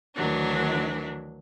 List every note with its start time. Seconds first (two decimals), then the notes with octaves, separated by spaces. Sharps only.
0.15 D2 D#3 E3 F#3 D4 A#4